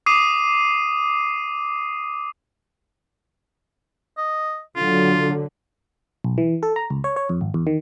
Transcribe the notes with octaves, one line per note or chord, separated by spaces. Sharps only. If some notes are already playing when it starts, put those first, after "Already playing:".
D6 D#6 C7 D#7
D#5
D3 F#3 F4
B1
E3
A4
A#5
C#2
C#5
C#5
F2
G#1
E2
D#3